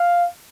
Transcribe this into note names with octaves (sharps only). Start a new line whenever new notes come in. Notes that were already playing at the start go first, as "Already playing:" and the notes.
Already playing: F5